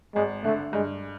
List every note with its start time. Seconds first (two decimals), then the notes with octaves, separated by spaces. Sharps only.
0.15 G#1 G#3
0.44 D3 A3
0.73 G2 G#3